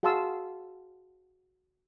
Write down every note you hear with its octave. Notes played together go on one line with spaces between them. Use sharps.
F#4 G#4 F5 A5 C6 E6